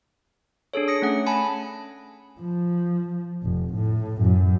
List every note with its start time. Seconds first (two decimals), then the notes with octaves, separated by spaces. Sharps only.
0.74 D4 G#4 A4 C#5
0.88 D#6 A#6 C#7
1.02 A3 C#4 F#5
1.26 G#5 A5 B5
2.40 F3
3.43 F1
3.75 A2
4.22 F#2